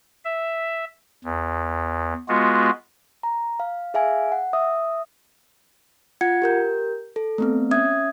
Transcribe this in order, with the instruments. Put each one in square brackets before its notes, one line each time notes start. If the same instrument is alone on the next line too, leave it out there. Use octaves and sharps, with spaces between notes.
[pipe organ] E5
E2
G#3 B3 F4 F#4
[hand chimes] A#5
F5
G#4 E5 F5 G#5
F#5
E5 D#6
F4 F#5 G#6 C#7
G4 A#4 G6
A4
A3 B3 C4
C#4 E5 D#6 G#6